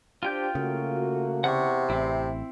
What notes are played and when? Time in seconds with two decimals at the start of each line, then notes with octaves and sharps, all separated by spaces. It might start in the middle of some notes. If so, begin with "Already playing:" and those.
0.23 D4 F4 G4 C5 G5 G6
0.55 C#3 A3 A#3 F#4
1.44 E2 C3 F#5 C#6
1.90 A1 C4 E4